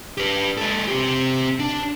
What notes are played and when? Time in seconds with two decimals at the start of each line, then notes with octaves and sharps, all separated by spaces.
0.18 G4 B4
0.57 G#3 A4
0.88 C4 G4
1.60 D4